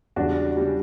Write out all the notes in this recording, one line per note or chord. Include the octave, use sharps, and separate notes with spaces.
E2 C#3 G3 D4 F#4
C#3 G3